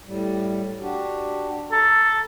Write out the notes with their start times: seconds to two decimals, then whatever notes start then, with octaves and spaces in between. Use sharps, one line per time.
0.06 A2 G3
0.80 D4 F#4 G4
1.72 A4 A#5